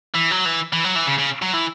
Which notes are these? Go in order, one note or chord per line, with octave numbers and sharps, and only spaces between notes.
E3
F#3
E3
E3
F#3
E3
C#3
C#3
F#3
E3